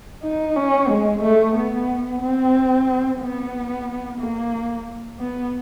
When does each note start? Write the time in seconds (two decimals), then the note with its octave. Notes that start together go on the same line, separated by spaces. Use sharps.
0.23 D#4
0.56 C#4
0.89 G#3
1.22 A3
1.55 B3
2.22 C4
3.21 B3
4.20 A#3
5.20 B3